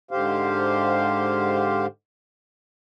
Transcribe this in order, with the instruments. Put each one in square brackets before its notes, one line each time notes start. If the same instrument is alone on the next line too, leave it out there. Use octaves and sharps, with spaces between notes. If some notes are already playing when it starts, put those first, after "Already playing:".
[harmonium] G#2 D3 G4 C5 F5